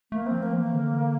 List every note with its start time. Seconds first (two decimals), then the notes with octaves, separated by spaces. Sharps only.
0.11 A3 A#3
0.27 F3 C4
0.43 A#3
0.52 E3
0.57 A#3
0.73 D3